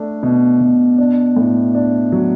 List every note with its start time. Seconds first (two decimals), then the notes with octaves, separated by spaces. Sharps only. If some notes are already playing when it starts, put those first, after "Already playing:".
Already playing: A3 D4
0.23 B2
0.60 B2
0.98 D4
1.36 A2
1.75 D4
2.12 F#3